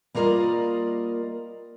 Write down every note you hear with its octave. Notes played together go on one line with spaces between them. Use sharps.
G3 A#3 F4 A#4 D5 D#5